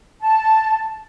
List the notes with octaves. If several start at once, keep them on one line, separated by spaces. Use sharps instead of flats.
A5